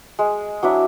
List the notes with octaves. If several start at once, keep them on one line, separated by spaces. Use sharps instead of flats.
G#3
F#3 D4 E4